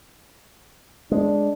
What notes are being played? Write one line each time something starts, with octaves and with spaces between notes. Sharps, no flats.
G#3 D4